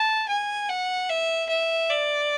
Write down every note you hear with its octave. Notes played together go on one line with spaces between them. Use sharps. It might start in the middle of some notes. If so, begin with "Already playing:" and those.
Already playing: A5
G#5
F#5
E5
E5
D5